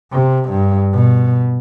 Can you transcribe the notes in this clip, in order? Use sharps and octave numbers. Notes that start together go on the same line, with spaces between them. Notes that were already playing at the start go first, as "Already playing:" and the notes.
C3
G2
B2